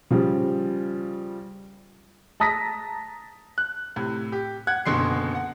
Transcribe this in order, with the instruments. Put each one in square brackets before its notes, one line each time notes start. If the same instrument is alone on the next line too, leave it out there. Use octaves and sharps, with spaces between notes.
[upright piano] C#3 F3 G3
A5 A#5 D#6 A#6 B6
[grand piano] F#6
A2 C3
G4
F#5 F#6 G#6
F#1 B2 D3 C6 C7
F#5